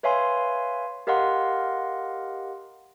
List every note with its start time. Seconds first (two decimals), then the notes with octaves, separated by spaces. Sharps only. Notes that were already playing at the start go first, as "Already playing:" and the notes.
0.03 B4 C#5 E5 F5 G#5 C6
1.07 G4 A#4 D#5 F5 F#5 C6